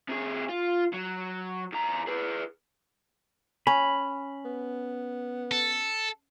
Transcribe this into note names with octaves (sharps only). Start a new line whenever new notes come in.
C3 G#4
F4
F#3
E2 A#5
G#4 B4
C#4 B5
B3
A4